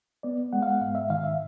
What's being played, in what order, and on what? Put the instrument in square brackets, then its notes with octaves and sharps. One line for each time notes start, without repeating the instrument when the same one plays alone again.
[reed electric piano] B3 D5
G#3 F#5
F5
F#5
G#2 F5
E5
D#3 F5
E5